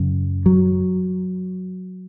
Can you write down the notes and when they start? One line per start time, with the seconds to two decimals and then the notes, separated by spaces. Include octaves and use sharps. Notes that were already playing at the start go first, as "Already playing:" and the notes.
Already playing: F#2 C#3
0.46 F#3